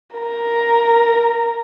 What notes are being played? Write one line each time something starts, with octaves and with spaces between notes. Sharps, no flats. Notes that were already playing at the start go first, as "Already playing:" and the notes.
A#4 A#5